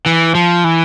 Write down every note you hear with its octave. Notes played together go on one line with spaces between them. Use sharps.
E3
F3
E3